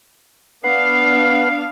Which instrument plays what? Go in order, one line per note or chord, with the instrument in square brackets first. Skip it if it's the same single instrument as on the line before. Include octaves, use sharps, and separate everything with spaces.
[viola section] B3 D4 F5 [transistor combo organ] B4 F#5 [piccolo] C7